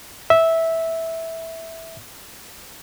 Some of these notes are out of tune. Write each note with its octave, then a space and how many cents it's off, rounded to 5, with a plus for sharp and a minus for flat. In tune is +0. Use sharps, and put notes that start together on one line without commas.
E5 -10